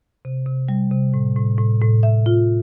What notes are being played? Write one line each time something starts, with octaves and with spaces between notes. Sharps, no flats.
C3
C3
G3
C3
A2
A2
A2
A2
E5
F4